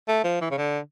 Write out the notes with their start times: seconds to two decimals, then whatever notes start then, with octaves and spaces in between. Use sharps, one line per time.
0.08 A3
0.24 F3
0.41 E3
0.51 C#3
0.58 D3